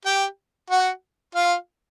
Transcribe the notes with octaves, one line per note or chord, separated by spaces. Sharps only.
G4 G5
F#4 F#5
F4 F5